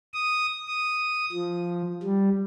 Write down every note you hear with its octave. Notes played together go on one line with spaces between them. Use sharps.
D#6
D#6
F3
G3